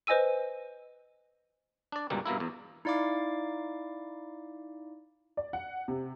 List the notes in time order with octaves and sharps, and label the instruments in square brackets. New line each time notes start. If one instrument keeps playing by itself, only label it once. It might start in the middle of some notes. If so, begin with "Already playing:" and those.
[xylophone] B4 C5 D#5 G#5 E6 D#7
[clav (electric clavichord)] D4 D5
G1 C#2 B2 G3 A#3
G2 B2 A#3 E4
E2
[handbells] D#4 E4 D5 F5 D6
[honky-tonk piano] D5
F#5
C3